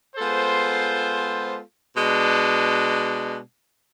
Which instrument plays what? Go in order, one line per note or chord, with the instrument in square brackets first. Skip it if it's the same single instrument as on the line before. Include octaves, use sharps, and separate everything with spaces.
[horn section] G#3 B3 F4 A4 C5
B2 G#3 D4